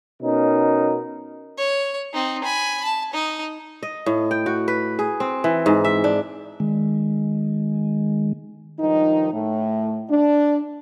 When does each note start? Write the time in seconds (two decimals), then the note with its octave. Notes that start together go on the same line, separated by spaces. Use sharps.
0.21 B2 C#4 D#4 A#4
1.57 C#5
2.13 C4 D#4
2.44 G#5 B5
2.84 A5
3.13 D#4
3.83 D#5
4.06 A2
4.31 G5
4.46 F#4
4.68 B4
4.99 G#4
5.20 C4
5.44 E3
5.66 G#2
5.84 E5
6.04 D4
6.60 D#3 G#3
8.79 G2 D#3 F3 D#4
9.32 A2 A3
10.10 D4